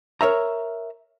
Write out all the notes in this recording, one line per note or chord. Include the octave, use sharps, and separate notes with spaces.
A#4 C#5 E5 A#5